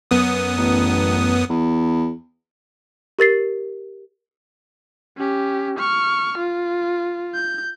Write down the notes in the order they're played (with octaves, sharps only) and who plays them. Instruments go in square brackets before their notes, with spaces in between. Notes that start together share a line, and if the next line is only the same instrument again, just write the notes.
[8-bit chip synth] F#2 B3 D#6
[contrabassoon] A1
E2
[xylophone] G4 A#4 A6 C7
[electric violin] C#4 G4
C#6 F6
F4
G6